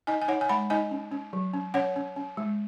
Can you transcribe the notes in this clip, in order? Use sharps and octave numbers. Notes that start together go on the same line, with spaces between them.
D#4 D#5 G#5
G#5
D#4 C#5 F#5
G#5
G#3 F#5 B5
D#4 D#5 G#5
C#4
C#4
F#3
C#4
C#4 C#5 F#5
C#4
C#4
G#3